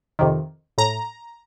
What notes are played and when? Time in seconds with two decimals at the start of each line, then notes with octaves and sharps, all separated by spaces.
0.19 F2 C3 D#3
0.78 A2 A#5